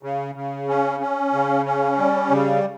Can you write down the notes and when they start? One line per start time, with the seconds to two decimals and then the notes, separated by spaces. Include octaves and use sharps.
0.03 C#3
0.35 C#3
0.68 C#4
1.00 C#4
1.33 C#3
1.66 C#4
1.98 G3
2.30 C#3